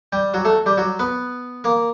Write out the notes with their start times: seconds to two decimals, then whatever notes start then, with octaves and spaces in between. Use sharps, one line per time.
0.12 G3 G4
0.34 F#3 F#4
0.45 A3 A4
0.66 G3 G4
0.77 F#3 F#4
0.99 B3 B4
1.64 A#3 A#4